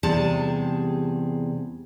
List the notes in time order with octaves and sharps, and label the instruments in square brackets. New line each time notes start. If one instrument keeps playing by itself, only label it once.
[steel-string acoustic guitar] E2 C3 G3 G#4 A5